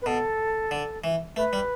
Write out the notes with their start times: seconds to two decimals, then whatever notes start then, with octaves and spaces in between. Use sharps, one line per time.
0.01 B4
0.06 B2 A4
0.71 D3
1.04 E3
1.36 A3 B4
1.53 G3